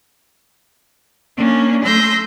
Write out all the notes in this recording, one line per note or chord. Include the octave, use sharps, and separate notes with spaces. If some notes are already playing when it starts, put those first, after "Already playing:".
A#3 C#4 D4
A3 C6 E6 G6 A#6